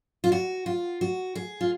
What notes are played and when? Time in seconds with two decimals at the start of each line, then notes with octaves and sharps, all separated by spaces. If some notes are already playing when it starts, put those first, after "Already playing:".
0.24 F4
0.32 F#4
0.66 F4
1.01 F#4
1.35 G#4
1.61 F4